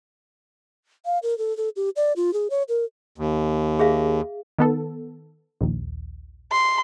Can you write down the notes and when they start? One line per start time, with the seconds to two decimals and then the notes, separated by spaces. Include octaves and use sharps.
1.05 F5
1.23 A#4
1.38 A4
1.57 A4
1.76 G4
1.96 D5
2.16 F4
2.33 G#4
2.50 C#5
2.68 A#4
3.18 D#2
3.79 G#4 E5 F5
4.59 D#3 B3 A4
5.61 A#1 D#2
6.52 C6